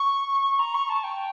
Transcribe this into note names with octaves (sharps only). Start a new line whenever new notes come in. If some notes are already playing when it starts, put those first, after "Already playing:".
Already playing: C#6
A#5
C#6
A5
G5